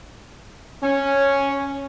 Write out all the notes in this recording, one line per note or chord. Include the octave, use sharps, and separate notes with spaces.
C#4